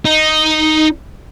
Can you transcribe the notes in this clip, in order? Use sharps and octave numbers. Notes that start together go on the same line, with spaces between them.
D#4